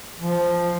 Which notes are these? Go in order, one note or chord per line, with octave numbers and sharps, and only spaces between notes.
F3